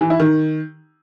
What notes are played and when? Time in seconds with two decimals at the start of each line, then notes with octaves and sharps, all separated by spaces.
0.01 E3
0.10 E4
0.20 D#3